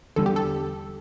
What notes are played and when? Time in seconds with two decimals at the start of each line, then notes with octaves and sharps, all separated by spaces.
0.16 E2 D3 G3 A4
0.26 G4
0.36 A4